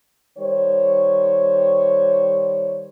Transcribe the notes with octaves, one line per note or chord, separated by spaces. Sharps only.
D#3 G3 C5 C#5